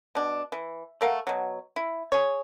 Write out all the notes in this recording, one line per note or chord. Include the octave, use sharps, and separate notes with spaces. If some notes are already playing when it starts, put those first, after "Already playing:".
B2 D4
E3
A3 A#4 F5 F#5
B2 F#3
E4
G#4 C#5